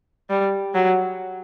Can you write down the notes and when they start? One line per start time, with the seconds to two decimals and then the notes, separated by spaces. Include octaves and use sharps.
0.30 G3
0.74 F#3